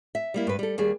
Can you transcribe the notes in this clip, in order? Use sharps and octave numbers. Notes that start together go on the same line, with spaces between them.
E5
G3 A#3 E4
G2 B4
G3 A4
D#2 G3 G#4